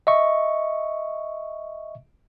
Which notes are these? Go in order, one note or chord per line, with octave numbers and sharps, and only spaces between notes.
D#5 E5 C#6